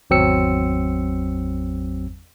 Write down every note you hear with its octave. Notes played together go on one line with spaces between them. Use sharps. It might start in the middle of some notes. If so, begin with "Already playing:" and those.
G#1 E2 F#3 C4 E6 C#7